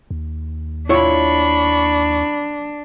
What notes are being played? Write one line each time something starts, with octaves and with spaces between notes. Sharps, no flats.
D#2
D4 E4 F4 C#5 B5 C#6